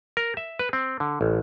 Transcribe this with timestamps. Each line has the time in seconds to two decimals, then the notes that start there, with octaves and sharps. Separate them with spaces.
0.17 A#4
0.37 E5
0.59 B4
0.73 C4
1.00 D3
1.21 A1